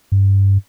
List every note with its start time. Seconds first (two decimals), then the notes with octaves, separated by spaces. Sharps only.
0.12 G2